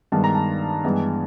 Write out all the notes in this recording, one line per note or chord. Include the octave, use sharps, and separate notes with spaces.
G2 D#3 G#3 B3 A5
A#5
A5
G2 E3 G#3 B3